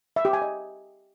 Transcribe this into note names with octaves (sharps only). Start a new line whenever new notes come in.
E5
G4
G#5
D#5